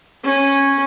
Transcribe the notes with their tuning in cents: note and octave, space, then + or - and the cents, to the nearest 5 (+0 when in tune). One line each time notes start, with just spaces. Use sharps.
C#4 -10